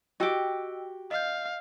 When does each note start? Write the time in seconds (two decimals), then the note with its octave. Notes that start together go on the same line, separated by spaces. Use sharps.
0.20 F#4 G4 D#5 G5 E6
1.11 D#5 F5 G6